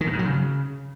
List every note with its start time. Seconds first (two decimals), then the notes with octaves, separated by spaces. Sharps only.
0.01 D#3
0.07 A2
0.13 G#2
0.19 F#3
0.25 C#3